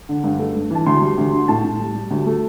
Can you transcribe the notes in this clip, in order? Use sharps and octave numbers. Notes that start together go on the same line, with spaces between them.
D3
G2
A3
G2
E3 A5
D2 C6
G3
D2
D3
A2 A5
A2
G3
G3
D2
A3